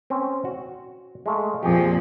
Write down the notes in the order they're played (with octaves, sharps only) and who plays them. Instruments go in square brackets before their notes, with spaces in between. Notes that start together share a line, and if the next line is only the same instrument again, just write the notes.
[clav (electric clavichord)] C4 C#4
F#4
G#3 A3 F5
[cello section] F2 A#2 F3 [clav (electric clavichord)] G4 G#4